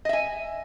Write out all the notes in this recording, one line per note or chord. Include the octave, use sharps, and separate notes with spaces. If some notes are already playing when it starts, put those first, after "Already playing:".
D#5 E5 G#5